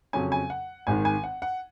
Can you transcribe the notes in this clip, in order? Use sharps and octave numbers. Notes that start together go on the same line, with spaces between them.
F2 C#3 F#3 C#4 G#5
G#5
F#5
G#1 G#2 D#3 G#5
G#5
F#5
F#5